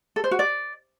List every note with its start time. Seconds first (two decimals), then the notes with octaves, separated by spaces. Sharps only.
0.16 A4
0.24 C5
0.31 F#4
0.39 D5